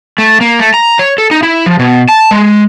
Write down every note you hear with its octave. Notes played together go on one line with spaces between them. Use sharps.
A3
A#3
A3
A#5
C#5
A4
D#4
E4
F3
B2
A5
G#3